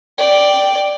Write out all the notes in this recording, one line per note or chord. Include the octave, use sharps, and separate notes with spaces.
D5 G5